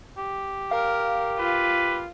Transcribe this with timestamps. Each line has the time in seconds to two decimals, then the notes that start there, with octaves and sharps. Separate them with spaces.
0.18 G4
0.71 A#4 F5
1.39 F4 B4